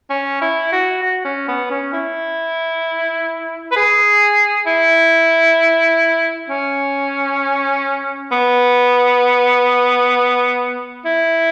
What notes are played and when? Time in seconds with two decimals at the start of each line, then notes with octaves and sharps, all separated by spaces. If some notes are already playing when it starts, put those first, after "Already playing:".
0.10 C#4
0.41 E4
0.72 F#4
1.03 F#4
1.25 C#4
1.48 B3
1.70 C#4
1.93 E4
3.71 B4
3.76 G#4
4.67 E4
6.49 C#4
8.32 B3
11.05 E4